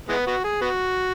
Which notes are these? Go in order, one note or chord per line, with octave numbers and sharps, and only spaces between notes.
E3 G#3 B3
B3 F#4
G#4
B3 F#4